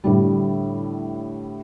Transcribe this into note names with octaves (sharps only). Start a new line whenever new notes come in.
A2 D3 G3